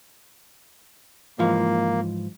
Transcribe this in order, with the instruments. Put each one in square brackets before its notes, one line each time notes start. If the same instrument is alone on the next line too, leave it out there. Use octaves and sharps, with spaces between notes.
[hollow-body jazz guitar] G#2 E3 F3 [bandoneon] A#3